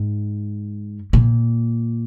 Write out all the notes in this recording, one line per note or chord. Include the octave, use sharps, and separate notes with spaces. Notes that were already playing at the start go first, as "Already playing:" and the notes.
Already playing: G#2
A#2